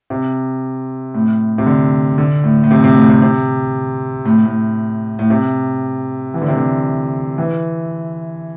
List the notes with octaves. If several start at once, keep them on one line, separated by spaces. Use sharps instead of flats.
C3
A2
C3
D3
D3
A2
A2
C3
C3
A2
C3
C3
A2
A2
A2
C3
E3
D3
C3
D3
E3